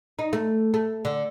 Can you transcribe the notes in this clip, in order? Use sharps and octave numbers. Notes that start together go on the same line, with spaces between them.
D#4
A3
A3
D3